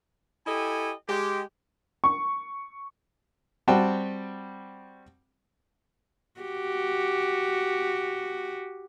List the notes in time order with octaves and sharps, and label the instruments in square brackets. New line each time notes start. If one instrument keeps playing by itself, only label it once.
[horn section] E4 G4 A4 D#5 G#5
G#3 G4
[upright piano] C#6
[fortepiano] G3 C4 F#4 G5 A5
[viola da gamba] F#4 G4